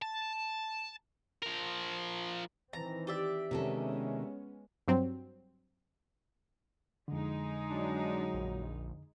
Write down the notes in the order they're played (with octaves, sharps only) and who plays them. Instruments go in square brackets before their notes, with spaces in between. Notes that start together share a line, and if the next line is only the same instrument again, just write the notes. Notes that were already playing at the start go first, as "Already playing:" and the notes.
[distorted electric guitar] A5
F3 A#4
[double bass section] D#3 E3 C4 [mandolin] A#5
[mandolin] G4 D5 E5
[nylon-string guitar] C3 D#3 A4 [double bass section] G#3 B3 C#4
[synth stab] G2 F#3 C4
[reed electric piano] F2 D3 [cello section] G#3 D#4
[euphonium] F#3 [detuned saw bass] D4
[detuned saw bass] A#1